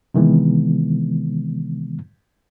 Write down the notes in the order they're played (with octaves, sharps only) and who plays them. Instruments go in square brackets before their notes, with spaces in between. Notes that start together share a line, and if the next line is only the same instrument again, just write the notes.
[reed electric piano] C3 D#3 E3 G#3 B3